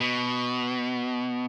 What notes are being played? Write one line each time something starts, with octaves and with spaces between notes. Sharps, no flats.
B2